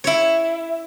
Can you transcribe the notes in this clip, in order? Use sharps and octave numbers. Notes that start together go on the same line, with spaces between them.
E4 C#5